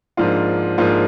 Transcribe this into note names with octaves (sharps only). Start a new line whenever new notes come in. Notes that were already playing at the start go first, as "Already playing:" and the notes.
G#2 F3 A#3 D4 F4
G#2 F3 A#3 D4 F4